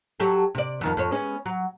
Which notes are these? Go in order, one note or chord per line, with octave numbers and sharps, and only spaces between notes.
F#3 G4 A4
C3 D5
F2 D#3 E3
F2 C#5
G#3 B3 C#4
F#3